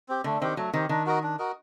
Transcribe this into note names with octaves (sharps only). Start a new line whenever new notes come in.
C4 G4
D3 A3
D#3 C4 G4
F#3 A3
D#3 C4 G4
D#3 D4
F#4 A#4 D#5
D4
F#4 A#4 D#5